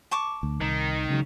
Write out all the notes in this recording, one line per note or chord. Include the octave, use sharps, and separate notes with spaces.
A5 C#6 D6
D2
C2 D#3
C#2 C#3 F#3